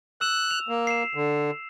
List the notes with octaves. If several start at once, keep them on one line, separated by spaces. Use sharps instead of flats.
E6 F#6 E7
F7
A#3
C7 E7
D3